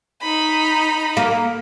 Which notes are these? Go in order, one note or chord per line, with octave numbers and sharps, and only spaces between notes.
D#4 B5
A#3